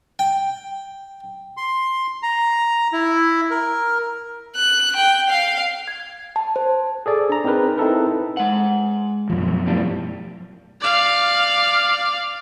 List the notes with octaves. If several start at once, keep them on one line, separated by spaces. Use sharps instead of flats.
G5
C6
A#5
E4
A#4
F#6
G5
F5
G#6
A5
C5
G#4 A4 D5
D4 A#5
C4 D#4 G#4 A#4 B4
C4 D#4 E4 A4 B4
G#3 F#5
F#2 B2 F3
F2 A2 G3
D5 F5